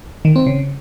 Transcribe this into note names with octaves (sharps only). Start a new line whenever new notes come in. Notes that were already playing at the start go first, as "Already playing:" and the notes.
D#3
C4
C#3